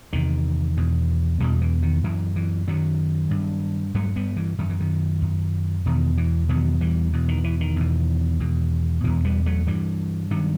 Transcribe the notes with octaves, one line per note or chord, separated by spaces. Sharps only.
E2 C3 D#3
E2 B2
E2 B2 E3 G3
E3
D#3
F#2 E3
E3
F#2 D#3 F#3
G2
G2 F#3 A3
G3 B3
E3
F#2 D#3
E3
D#3
F#2
E2 B2 D#3
E3
E2 B2 D#3 F#3
E3 G3
E2 B2
D#3
E3
D#3
E2 B2
E2 B2
E2 B2 E3
G3 B3
F#3 A3
G2 E3 G3
G2 D#3 F#3